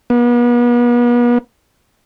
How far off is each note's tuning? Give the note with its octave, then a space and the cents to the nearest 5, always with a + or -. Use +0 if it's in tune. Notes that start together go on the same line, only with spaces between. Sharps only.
B3 -40